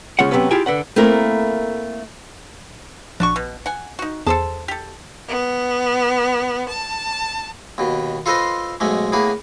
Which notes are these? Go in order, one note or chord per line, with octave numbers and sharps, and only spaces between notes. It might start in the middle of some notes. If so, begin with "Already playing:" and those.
C#3 G#3 C#4 F4 F#5
C3 E3 F#3 B3 C#4
E4 F4 G4 G#4 G5 G#5
D3 B4 F#5
A3 A#3 C4 E4 A#4
A#1 D4 F#4 C#6
B2
F#5 G#5
D#4 F#4
E2 G#4 A4 C5 A5
G4 A4
B3
A5
D#2 B2
F4 A4 B4 C5 D#5 C6
B1 G#2 G#3 A3
A2 A#3 B3 G#4